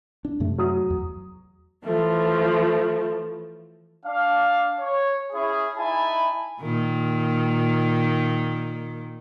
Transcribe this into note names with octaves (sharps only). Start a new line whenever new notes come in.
D4
F#2 C3 A3
F#3 D#6
E2
E3 F3 A3
D4 F5
C#5
C#4 E4 G#4
D#4 E4 G#5 A5 B5
A#2 D#3